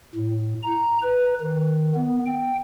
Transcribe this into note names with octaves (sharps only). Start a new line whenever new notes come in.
A2
A#5
B4
D#3
B3
G5